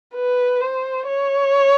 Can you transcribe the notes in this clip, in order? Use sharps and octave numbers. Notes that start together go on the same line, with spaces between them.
B4
C5
C#5